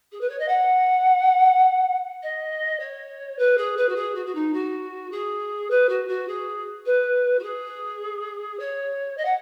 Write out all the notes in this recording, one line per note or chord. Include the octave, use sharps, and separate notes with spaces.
G#4
B4
C#5
D#5
F#5
D#5
C#5
B4
G#4
B4
F#4
G#4
F#4
F#4
D#4
F#4
G#4
B4
F#4
F#4
G#4
B4
F#4
G#4
C#5
D#5
F#5